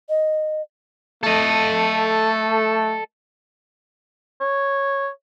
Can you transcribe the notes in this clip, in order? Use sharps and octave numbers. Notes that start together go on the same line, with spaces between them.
D#5
A3 A4 D#5
C#5